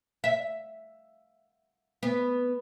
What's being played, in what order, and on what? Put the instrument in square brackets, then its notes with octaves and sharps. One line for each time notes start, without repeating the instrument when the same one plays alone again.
[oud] E5
B3